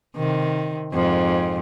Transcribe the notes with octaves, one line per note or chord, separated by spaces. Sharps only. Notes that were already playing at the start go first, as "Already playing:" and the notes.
C3 D#3
F2 G#2